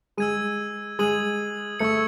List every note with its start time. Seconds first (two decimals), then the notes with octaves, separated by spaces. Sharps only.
0.17 G#3 E6 G#6 D#7
0.99 G#3 D#6 G#6 D#7 F#7
1.79 A3 C#6 E6 G#6 C#7